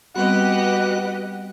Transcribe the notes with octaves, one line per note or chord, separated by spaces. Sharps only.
G3 B3 C4 F#4 G4 B4 D#5 F#5